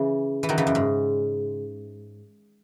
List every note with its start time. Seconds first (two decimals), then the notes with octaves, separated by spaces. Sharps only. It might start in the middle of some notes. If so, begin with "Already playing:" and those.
Already playing: C#3 E3
0.43 E3
0.49 D#3 F#3
0.58 C#3 E3
0.67 F#2
0.75 G#2